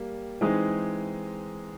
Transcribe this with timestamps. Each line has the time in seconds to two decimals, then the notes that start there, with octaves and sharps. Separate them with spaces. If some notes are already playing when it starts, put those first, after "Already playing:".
Already playing: G3 A#3
0.41 E3 G#3 C4 D#4 G#4